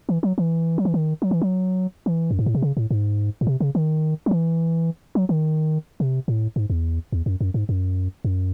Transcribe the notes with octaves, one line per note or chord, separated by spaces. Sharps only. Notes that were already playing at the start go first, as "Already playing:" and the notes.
E3
F#3
E3
F#3
E3
D#3
F#3
E3
F#3
E3
F#2
G#2
A2
C3
C#3
A2
G#2
A2
C3
C#3
D#3
F#3
E3
F#3
D#3
C3
A2
G#2
E2
E2
F#2
F#2
G#2
F#2
F#2